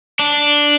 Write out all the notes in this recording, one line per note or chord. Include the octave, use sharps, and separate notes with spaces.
D4